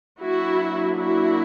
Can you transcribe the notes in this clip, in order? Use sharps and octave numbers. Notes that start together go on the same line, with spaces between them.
F#3 A#3 D4 E4 F#4
E4 F#4